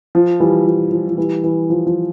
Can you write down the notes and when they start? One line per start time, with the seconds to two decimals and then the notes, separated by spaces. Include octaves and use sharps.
0.15 F3
0.40 E3 G3
0.66 F3
0.92 F3
1.07 F3
1.18 E3 G3
1.44 E3
1.70 F3
1.87 F3